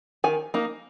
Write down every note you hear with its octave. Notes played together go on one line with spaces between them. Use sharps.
D#3 G#5
A#3 D#4